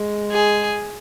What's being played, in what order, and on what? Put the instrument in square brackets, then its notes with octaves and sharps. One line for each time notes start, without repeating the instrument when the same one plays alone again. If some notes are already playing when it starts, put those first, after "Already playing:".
Already playing: [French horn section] G#3
[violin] G#4